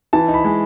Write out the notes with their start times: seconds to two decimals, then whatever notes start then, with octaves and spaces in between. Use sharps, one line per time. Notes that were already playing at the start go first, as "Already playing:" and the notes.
0.13 E3 A5
0.28 D#4
0.34 B5
0.45 G#3